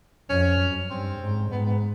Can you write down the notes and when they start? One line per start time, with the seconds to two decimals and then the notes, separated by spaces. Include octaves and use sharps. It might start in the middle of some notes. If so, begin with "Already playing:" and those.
0.29 F2 C#4
0.60 F#2
0.90 G2 C4
1.21 G#2
1.51 G#2 B3
1.66 B3